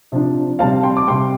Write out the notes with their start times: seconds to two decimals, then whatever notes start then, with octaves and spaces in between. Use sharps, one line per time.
0.12 C3 F3 D4
0.59 C3 G3 C4 F5 A5
0.83 G5 C6
0.97 D6
1.08 C3 G3 C4 G5 C6